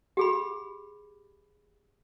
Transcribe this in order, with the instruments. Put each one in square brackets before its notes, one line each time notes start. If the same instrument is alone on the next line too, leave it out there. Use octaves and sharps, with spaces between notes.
[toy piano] G4 G#4 B5